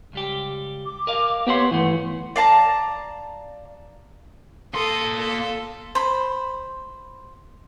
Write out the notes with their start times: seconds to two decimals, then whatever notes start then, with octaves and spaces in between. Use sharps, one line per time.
0.13 C#2 G3 G4
0.85 D6
1.07 A#4 D#5 F5
1.47 A#3 B3 G4 C#5 F#5 C6
1.71 G2 D#3 E3 A3 F#5
2.36 D5 F5 A5 A#5
4.74 A#3 A4 C6 D#6
5.18 A4
5.95 C5 B5